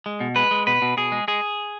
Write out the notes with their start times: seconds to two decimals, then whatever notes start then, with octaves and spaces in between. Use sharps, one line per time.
0.06 G#3
0.20 B2
0.36 G#3 B4
0.51 G#3
0.67 B2 B4
0.82 B2
0.97 B2 G#4
1.12 G#3
1.28 G#3 G#4